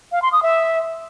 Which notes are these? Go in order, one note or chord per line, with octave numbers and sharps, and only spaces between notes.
F5
C6
D#6
E5